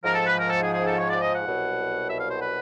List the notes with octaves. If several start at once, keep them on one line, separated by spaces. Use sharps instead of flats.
G#2 F3 A#4
A4
B4
A#4
A4
G#4
G#4
A4
C#5
D5
D#5
F#5
C2 B2 F#3
E5
F5
C5
B4